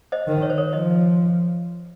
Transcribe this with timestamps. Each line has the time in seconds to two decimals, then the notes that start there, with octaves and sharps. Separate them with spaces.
0.12 C5 D#5
0.27 D#3
0.42 C#5
0.50 C5
0.58 A#4 C#5
0.72 F3 C5 D#5